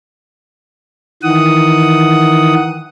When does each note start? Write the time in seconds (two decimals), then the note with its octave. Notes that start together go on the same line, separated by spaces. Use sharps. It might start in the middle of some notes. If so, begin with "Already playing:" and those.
1.23 D#3 E3 F#5 D#6